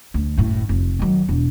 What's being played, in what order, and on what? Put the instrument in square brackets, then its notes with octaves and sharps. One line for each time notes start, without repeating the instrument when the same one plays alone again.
[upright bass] D2
F#1 A2
F1
D#3 F#3
E1